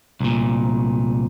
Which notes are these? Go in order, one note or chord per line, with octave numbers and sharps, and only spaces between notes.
C2 A#2